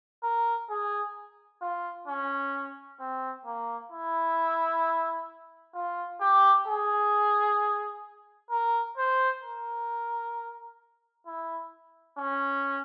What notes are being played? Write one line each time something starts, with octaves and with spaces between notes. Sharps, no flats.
A#4
G#4
F4
C#4
C4
A#3
E4
F4
G4
G#4
A#4
C5
A#4
E4
C#4